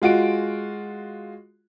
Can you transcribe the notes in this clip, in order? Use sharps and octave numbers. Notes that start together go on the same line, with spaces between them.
G#3 F4 F#4 D7